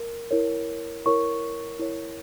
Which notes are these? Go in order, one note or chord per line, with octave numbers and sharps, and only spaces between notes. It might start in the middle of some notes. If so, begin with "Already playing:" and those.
Already playing: A#4
E4 A#4 C#5
E4 A#4 C#5 C#6
E4 A#4 C#5